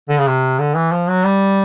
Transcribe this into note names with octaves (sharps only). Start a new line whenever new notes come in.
D3
C#3
C3
D3
E3
F3
F#3
G3